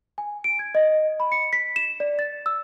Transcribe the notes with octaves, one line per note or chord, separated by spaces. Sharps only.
G#5
D7
G#6
D#5
B5
C#7
B6
E7
D5
A6
E6